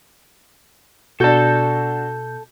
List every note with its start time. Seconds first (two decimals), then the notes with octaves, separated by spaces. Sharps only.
1.20 B2 D4 F#4 A4 A5 G6